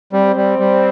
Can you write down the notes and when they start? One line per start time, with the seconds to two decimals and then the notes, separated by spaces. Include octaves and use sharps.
0.13 G3 C4
0.36 G3
0.59 G3